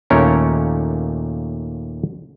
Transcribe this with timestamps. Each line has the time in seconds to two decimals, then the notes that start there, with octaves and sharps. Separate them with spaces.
0.10 D#2 A#2 A3 C#4 A#4 C#5